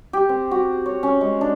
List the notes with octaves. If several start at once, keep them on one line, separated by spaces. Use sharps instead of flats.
G4
C4
F#4
C#5
C#4
G#3
D4